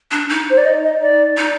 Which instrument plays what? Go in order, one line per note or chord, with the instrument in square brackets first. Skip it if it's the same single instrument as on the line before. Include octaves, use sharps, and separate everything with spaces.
[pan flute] D4
D#4
[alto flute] C5
D5
D#5
D#5
D5
[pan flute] D#4